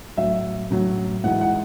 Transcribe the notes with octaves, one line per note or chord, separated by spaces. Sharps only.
A2 F#3 E5
A2 F#3
G#2 E3 F#5
F#5